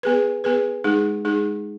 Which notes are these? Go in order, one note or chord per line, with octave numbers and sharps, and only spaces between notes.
B3 G#4 B4
B3 G#4 B4
G#3 D#4 G#4
G#3 D#4 G#4